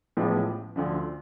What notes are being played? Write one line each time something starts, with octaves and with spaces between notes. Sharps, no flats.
A1 A2 F3 G#3 B3
D2 D3 F3